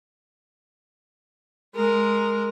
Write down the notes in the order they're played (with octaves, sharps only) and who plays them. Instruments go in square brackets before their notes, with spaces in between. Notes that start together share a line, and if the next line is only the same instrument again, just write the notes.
[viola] G#3 A#4